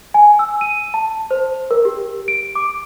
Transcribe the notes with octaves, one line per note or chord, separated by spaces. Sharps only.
G#5
E6
D#7
A5
C5
A#4
G4
D7
D6